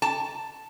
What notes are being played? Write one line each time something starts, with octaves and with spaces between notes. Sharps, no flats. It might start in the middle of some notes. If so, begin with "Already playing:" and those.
A5